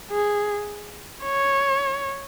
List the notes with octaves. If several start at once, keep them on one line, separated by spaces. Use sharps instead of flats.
G#4
C#5